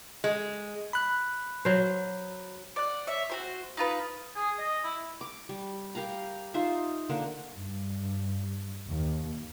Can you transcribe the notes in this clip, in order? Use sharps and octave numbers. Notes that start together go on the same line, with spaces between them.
G#3
B5 F#6
F#3 C5
D5 F#5
C#5 E5
F#4 G4 C5
D#4 F4 B4
G#4
D#5
E4
D6
G3
G4 A#4 F5 A#5
D#4 F4 C5 E5
D3 A#3 D4 A#4
G2
D#2